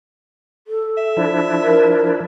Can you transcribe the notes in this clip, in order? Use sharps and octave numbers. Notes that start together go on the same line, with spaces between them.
A4
E5
F3 D4 E4
A#4